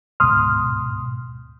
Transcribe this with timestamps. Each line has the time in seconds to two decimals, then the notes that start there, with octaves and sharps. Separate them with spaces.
0.20 D2 G#2 B2 C6 D#6 F6